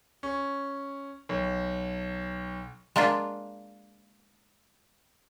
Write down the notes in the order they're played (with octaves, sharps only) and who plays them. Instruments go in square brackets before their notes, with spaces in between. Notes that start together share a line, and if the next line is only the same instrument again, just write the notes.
[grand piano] C#4
B1
[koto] G#3 A#3 D4 F4